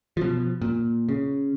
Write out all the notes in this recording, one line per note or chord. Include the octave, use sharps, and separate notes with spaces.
B2 F3
A#2
C#3